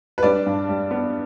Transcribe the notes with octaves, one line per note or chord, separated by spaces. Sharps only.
B4
G3 D4 D5
G2
G3
B3